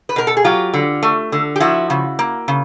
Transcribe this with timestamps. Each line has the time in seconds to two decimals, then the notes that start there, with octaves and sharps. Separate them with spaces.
0.09 B4
0.16 B2 A#4
0.27 A4
0.37 G#4
0.44 F#3 F4 G4
0.74 D3
1.03 A3
1.32 D3
1.56 G4
1.60 F3 E4 F#4
1.90 C#3
2.19 A#3
2.48 C#3